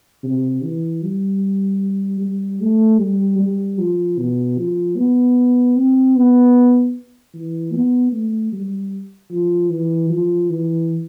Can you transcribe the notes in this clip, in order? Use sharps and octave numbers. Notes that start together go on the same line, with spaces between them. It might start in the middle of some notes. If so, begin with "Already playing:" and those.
C3
E3
G3
G3
A3
G3
G3
F3
B2
F3
B3
C4
B3
E3
B3
A3
G3
F3
E3
F3
E3